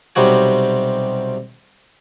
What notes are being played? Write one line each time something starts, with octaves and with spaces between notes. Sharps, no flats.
B1 C3 G3 F#4 G#5